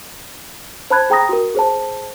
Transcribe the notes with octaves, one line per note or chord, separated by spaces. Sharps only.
C5 A5 B5 F#6 G#6
G#4 G5 A#5 D#6 A#6
F#4 A#4
G#4 C5 A5